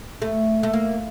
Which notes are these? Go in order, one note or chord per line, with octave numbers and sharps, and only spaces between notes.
A3
A3
A#3